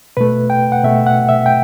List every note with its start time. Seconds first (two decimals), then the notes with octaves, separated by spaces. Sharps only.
0.17 B2 A3 B4
0.50 G5
0.72 F#5
0.84 B2 A3 E5
1.07 F#5
1.29 E5
1.46 G5